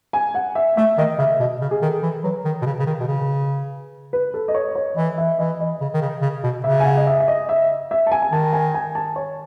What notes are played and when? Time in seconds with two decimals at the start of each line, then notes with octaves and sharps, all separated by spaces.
0.13 G#5
0.35 F#5
0.55 E5
0.77 A3 E5
0.98 D#3 D#5
1.18 C#3 E5
1.40 B2 D#5
1.61 C#3
1.71 G#4
1.82 D#3 A4
2.03 E3
2.24 F#3 B4
2.45 D#3
2.62 B2
2.66 C#3
2.79 C#3
2.86 D#3
3.00 B2
3.07 C#3
4.13 B4
4.34 A4
4.48 D#5
4.54 C#5
4.75 C#5
4.96 E3 D#5
5.18 E5
5.38 E3 D#5
5.60 D#5
5.81 C#3
5.93 D#3
6.02 C#3
6.22 C#3
6.43 B2
6.64 C#3 E5
6.80 G#5
6.85 F#5
6.97 D#5
7.07 E5
7.20 E5
7.28 D#5
7.49 E5
7.91 E5
8.07 A5
8.11 G#5
8.22 G#5
8.32 D#3 A5
8.53 G#5
8.74 G#5
8.95 A5
9.16 C#5